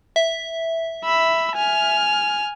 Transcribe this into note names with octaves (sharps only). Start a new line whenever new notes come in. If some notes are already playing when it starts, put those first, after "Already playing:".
E5
B5 E6
G#5 F6